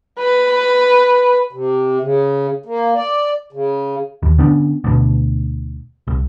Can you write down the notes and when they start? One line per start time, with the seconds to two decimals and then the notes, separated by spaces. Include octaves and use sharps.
0.19 B4
1.53 C3
2.01 C#3
2.66 A#3
2.94 D5
3.53 C#3
4.23 D#2
4.38 D3 B3 C#4 D4
4.84 D2 B2
6.07 C2